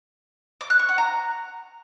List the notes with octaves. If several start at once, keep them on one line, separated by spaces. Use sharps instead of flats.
D6
F#6
C#6
F#5
A#5